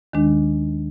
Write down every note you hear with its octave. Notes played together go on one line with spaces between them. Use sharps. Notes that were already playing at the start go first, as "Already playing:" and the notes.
D#2 D#3 G#3 D4